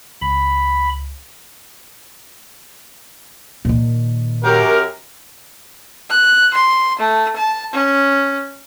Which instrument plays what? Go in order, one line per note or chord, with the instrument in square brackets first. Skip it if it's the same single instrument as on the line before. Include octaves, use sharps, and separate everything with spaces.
[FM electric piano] C#2 [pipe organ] B5
[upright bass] A#2 D#3
[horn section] F#2 G4 A#4
[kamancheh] F#6
C6
A3
A5
C#4